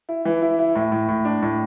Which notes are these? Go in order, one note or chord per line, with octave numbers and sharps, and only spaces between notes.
E4
E3
E4
E4
A2
A2
A2
D4
A2